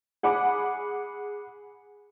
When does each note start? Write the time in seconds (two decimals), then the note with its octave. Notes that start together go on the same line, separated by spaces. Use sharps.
0.23 G#4 F#5 B5 D6